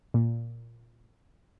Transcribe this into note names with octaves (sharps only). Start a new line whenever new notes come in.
A#2